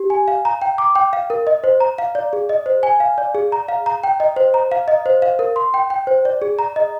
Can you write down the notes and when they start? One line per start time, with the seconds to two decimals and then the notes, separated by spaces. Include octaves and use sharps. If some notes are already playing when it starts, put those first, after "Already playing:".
Already playing: G4
0.10 G#5
0.28 F5
0.45 A#5
0.62 G5
0.78 D6
0.95 G5
1.13 F5
1.30 A#4
1.47 D#5
1.64 C5
1.80 A#5
1.98 F5
2.15 D5
2.33 G#4
2.49 D#5
2.66 C5
2.83 G#5
3.00 F5
3.18 D5
3.35 G#4
3.52 A#5
3.69 F5
3.86 A#5
4.04 G5
4.20 D#5
4.36 C5
4.54 A#5
4.71 F5
4.88 D#5
5.06 C5
5.22 F5
5.39 A#4
5.56 C6
5.74 G5
5.90 G5
6.07 C5
6.25 D5
6.42 G#4
6.59 A#5
6.76 D#5